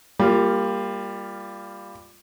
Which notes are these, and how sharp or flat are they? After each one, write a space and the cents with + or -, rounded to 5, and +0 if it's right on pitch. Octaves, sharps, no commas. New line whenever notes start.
G3 +15 A#3 -5 F4 +0